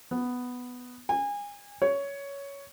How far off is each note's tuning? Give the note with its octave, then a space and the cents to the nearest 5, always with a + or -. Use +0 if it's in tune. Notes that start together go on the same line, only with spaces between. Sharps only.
B3 +5
G#5 -30
C#5 +10